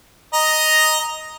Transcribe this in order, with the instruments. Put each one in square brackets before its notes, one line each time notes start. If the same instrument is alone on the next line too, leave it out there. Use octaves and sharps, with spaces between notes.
[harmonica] D#5 A#5